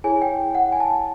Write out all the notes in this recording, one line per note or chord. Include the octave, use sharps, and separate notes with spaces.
E4 G#4 C#5 G#5
G5
F#5
G#5
A5